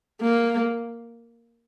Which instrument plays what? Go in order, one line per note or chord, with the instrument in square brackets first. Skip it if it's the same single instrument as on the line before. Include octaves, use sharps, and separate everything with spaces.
[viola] A#3